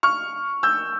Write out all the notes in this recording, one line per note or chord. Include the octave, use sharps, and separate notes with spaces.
C#6 F6
E6 G6